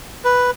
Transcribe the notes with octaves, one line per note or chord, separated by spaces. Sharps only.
B4